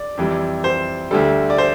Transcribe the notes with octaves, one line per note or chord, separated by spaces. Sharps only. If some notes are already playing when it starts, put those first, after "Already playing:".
Already playing: D5
F2 E3 G3
C5
D2 D3 G3 A4
D5
C5